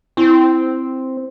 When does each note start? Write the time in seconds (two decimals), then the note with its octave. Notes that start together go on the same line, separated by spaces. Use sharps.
0.17 C4 E4